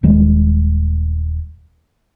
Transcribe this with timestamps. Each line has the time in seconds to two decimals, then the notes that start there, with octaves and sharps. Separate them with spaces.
0.03 D#1 D#3 G3 G#3